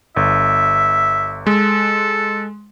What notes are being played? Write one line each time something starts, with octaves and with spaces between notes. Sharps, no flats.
G1 E5
G#3 A4